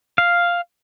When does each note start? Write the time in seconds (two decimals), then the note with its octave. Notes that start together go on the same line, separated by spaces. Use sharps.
0.18 F5